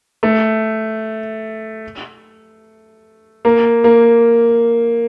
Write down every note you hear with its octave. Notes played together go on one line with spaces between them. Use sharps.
A3
A#3
A#3